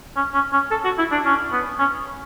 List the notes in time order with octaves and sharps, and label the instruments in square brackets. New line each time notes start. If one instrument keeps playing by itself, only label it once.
[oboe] C#4
C#4
C#4
A4
F#4
E4
D4
C#4
B3
C#4